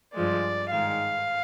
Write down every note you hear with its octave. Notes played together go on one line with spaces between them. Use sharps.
G2 F3 G#3 D5
G#2 D#3 G#3 F5